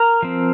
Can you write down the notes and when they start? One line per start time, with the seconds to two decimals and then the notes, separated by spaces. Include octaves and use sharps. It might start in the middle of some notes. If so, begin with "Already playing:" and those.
Already playing: A#4 A#5
0.22 F3 C4